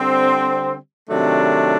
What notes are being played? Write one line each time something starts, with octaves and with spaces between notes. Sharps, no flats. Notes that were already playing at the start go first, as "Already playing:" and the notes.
Already playing: D3 G3 C4
C3 D#3 F#3 A3 D4